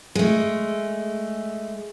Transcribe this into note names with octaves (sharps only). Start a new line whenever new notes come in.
G#3 A3